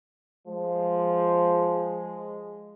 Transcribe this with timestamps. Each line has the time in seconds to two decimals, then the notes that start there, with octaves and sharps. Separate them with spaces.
0.47 F3 G#3